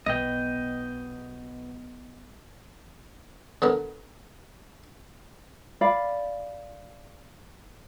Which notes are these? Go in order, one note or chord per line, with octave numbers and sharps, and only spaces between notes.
B1 B2 D#5 G5
D3 B3 A#4
D5 F5 B5